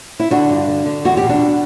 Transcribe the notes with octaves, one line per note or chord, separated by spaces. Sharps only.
E4
D3 D4 F#4
G2
D3
D3
E2 F#4
G4
B2
D4 F#4